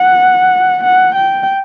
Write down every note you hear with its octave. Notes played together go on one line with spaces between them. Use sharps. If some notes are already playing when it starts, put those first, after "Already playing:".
Already playing: F#5
F#5
G5